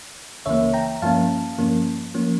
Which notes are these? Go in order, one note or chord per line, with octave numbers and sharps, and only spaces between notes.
C#2 C#3 E3 A#3 C#5 E5
G5 A#5
G2 F3 A#3 C#4 F5 A5
G2 F3 A#3 C#4
F3 A#3 C#4